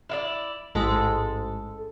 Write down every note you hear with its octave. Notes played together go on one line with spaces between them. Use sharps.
E4 F4 D5
A1 G#2 G#3 A4